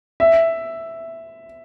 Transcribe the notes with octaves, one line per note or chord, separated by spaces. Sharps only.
E5